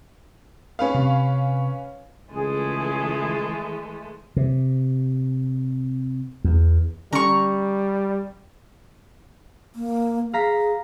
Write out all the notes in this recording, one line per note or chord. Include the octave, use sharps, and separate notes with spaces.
C#4 B4 F5
C3
C#2 E3 G#3 A3 G#4
C3
E2
D3 G3 C#4 A#5 C#6
A#3
G#4 F5 A#5 B6